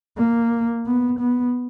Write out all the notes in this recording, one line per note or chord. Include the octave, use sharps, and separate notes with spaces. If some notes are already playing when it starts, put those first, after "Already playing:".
A#3
B3
B3